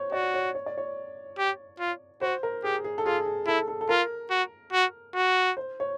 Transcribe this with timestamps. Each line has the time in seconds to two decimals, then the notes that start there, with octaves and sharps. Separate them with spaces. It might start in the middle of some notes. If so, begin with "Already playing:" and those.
Already playing: C5 C#5
0.12 F#4 D5
0.34 C#5
0.55 C#5
0.66 D5
0.78 C#5
1.39 G4
1.80 F4
2.21 F#4 C5
2.43 A#4
2.64 G4 G#4
2.84 G#4
2.98 A4
3.06 F4 G#4
3.26 G#4
3.47 E4 A4
3.68 A4
3.81 A4
3.89 F4 A#4
4.31 F#4
4.73 F#4
5.15 F#4
5.57 C5
5.80 C#5